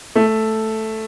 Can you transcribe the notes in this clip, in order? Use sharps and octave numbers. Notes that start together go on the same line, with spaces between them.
A3